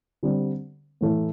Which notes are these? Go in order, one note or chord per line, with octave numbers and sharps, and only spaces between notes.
D3 G3 C4
A2 E3 A3